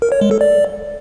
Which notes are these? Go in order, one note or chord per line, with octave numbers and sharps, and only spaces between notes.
A#4
C#5
G#3
A4
D5